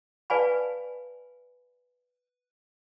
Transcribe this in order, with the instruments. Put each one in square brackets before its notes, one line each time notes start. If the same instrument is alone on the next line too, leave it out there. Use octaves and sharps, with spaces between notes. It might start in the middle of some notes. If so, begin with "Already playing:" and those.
[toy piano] B4 D5 F5 G#5 A5 B5